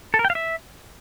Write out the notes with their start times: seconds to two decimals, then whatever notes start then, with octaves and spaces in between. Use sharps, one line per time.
0.14 A4
0.19 A#4
0.25 G5
0.30 F5
0.35 E5